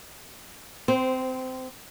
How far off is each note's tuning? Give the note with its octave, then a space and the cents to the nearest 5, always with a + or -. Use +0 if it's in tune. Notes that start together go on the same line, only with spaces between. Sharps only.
C4 -20 C5 +0